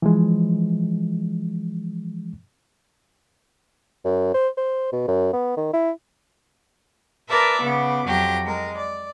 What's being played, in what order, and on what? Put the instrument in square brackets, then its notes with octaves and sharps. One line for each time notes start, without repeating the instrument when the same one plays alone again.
[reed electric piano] E3 F3 G#3
[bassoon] F#2
C5
C5
B2
F#2
B3
D#3
E4
[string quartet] A#4 B4 D5 E5 A5
C#3 B3 D6
F2 F#3 G4 A#6
G#3 A#4
D5